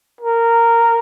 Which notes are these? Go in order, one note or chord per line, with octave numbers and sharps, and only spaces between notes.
A#4